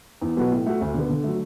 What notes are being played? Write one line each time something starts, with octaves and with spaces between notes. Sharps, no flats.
E2
B2 F#3 B3 F#4
A2
A3 F#4
D2
D3 B3
D3
F#3 A3